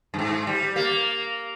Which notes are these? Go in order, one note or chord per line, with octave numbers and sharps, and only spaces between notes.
G2
G#2
G3
A#3